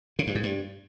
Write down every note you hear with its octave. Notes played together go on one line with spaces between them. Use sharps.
C#3
G2
G#2
G2